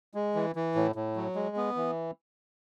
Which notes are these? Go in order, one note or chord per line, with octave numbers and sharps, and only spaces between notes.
G#3
E3
E3
A2
A2
F#3
G#3
B3
E3